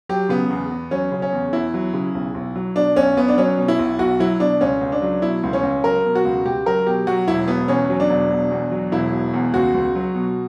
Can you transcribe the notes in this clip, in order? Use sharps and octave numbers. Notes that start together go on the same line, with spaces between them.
F#3 G4
C#3 B3
E2
E2
F#3 C#4
C#3
C#4
E2
E2 E4
F#3
C#3
B1
B1
F#3
B2 D4
B1 C#4
B1 B3
D4
F#3 C#4
B2
E4
B1
B1 F#4
F#3 E4
B2 D4
C#2 C#4
C#2
D4
F#3
B2 E4
C#2
C#4
C#2
F#3 A#4
B2
F#4
C#2
C#2 G4
F#3 A#4
B2 G4
F#3 F#4
E1 E4
B2 B3
E2 C#4
F#3
D4
E1
B2
E2
F#3
E1 E4
B2
E2
C#2 F#4
C#2
F#3
B2